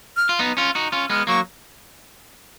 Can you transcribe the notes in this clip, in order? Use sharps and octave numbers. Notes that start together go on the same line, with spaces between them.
F6
F4
B3 D#4
C#4 F4
D#4 F#4
C#4 F4
G#3 B3 F6
F#3 A#3 C#6